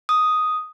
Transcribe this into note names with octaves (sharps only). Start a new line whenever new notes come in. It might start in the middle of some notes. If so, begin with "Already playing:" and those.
D#6